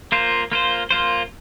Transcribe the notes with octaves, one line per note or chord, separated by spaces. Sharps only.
A#3 F4 C5
A#3 F4 C5
A#3 F4 C5